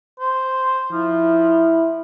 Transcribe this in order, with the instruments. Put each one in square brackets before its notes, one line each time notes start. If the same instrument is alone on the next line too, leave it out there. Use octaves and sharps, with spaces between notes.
[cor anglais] C5
[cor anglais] F3 [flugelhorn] E4